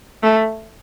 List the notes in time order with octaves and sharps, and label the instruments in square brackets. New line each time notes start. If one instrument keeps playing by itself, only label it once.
[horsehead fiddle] A3